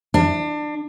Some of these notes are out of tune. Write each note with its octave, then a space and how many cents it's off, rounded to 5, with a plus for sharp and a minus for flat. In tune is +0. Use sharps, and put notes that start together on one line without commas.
D4 +25